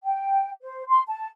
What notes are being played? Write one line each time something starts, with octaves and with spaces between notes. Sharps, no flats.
G5
C5
C6
A5